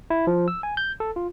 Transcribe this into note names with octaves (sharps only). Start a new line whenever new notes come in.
E4
F3
E6
G#5
G6
A4
F4